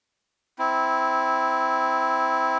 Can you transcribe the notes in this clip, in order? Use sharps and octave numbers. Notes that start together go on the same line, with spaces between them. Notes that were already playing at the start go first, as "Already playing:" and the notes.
C4 E4